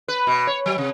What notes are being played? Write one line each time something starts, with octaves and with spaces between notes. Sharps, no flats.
B4
B2
C#5
F#3
C3